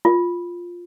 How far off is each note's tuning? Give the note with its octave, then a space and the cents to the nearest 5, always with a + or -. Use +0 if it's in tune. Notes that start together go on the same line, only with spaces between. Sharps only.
F4 +5